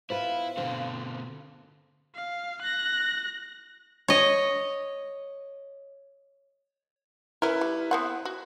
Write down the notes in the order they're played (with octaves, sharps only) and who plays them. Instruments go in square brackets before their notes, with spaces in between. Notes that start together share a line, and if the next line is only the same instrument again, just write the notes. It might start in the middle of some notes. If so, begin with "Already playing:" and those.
[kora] B3 F4 B4 [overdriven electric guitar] E4 [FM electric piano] C5 [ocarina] F5
[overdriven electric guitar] B2 D3 [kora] C4
[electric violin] F5
F#6 A#6
[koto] C#5 D#5
[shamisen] C#4 A#4 [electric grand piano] E4 B4
[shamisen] G3
B3 C4 F#5
F#4